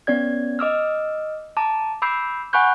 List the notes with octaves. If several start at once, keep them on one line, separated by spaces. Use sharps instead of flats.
B3 C#4 D5 G#6
D#5 D6 E6 F6
A5 A#5 D6
B5 D6 E6 G6 C7
F#5 G#5 B5 C#6 F#6 G6